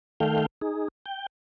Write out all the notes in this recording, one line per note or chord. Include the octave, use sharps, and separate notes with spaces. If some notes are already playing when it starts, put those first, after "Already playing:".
D#3 A3 A4 F5 G5
D#4 G#4
G5